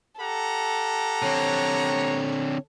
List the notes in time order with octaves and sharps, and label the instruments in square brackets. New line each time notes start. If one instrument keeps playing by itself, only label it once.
[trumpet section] G4 F#5 A#5 [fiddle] A4
[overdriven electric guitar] D3 C4 [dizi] C#5